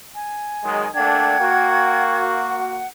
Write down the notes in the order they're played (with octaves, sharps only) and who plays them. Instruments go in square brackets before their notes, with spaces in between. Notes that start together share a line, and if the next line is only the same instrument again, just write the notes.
[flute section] G#5
[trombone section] D#3 F#3 G#3
[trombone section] A3 A#3 D4 [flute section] F#5 G5 G#6
[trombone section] A#3 F#4
[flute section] F#5